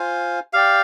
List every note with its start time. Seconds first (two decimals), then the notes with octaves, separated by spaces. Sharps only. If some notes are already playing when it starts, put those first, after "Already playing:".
Already playing: F4 C5 F5 G#5
0.53 G4 D5 F5 G5